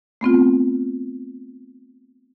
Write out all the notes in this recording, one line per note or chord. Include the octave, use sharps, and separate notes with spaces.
A3 B3 C4 F4